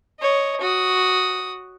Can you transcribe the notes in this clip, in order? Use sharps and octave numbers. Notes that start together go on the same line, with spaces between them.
C#5 D#5
F#4 D#6